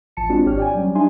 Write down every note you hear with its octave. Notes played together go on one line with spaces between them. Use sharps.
A1 F3 A5 C#7
G#3 C4 D4 F4 F#4
G#1 G4 C#5 F6
D5 G5 G#5
F#3 G3 C#4
D4 D#4 G4 E5 G#5 C6